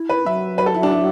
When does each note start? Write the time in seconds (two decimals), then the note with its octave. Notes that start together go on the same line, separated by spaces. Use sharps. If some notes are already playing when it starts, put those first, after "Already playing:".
Already playing: E4
0.09 B4
0.25 F#3 E5
0.58 B4
0.66 A4
0.74 E4
0.83 D4
0.91 E4